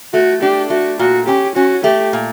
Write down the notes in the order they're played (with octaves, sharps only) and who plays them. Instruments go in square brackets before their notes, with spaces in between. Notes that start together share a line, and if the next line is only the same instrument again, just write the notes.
[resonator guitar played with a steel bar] A3 [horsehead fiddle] F#4
[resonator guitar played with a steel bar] D4 [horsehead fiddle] G4
[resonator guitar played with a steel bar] A3 [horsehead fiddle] F#4
[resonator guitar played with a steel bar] A#2 [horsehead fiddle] F#4
[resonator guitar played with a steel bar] C#4 [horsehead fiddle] G4
[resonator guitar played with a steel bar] C#4 [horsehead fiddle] F#4
[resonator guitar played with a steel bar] A3 [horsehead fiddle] G4
[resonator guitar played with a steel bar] A#2